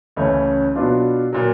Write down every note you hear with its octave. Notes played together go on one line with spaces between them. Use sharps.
C#2 C#3 E3 A3 C#4
B2 F#3 B3 D4 F4
A#2 F#3